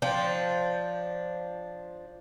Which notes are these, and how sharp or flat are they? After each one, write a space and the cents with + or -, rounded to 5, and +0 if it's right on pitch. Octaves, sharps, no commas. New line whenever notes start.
F3 +0 D4 +0 G5 +0